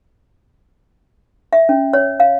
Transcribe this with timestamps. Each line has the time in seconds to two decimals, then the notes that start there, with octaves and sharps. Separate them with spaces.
1.53 E5
1.69 C#4
1.93 C#5
2.20 F5